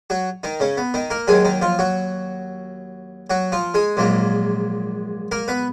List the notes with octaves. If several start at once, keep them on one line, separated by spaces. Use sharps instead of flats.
F#3 F#4
D#3 D#4
C#3 C#4
B3
D#3 D#4
A#3 A#4
D#2 D#3 F#3 G#3 G#4
D#3 D#4
F3 F4
F#3 F#4
F#3 F#4
F3 F4
G#3 G#4
A#1 G#2 F#3 A#3
A#3 A#4
B3 B4